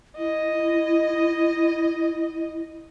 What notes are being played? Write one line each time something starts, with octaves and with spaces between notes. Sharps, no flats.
E4 D#5